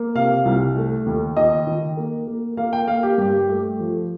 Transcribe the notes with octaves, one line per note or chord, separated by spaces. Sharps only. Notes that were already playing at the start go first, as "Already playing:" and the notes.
Already playing: A#3
C3 F5
C2
A3
D#2
D#2 D#5
D#3
A#3
A#3
A#3 F5
G5
A#3 F5
G4
G2 G4
A3
F3